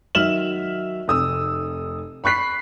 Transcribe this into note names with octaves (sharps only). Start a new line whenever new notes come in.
D#3 F#3 E5 F6 E7 F#7
F1 D#6 E6
B5 C#6 F#6 B6 C7